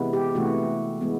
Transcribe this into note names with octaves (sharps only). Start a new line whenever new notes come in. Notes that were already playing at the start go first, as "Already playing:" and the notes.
Already playing: C3 E3 G#3 B3
G4
C3 E3 A3 F#4
E3 G#3 B3